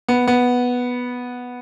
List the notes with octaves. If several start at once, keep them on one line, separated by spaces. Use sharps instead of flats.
B3
B3